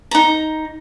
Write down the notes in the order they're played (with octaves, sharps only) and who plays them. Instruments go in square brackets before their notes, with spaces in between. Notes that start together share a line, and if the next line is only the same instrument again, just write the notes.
[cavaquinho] D#4 A#5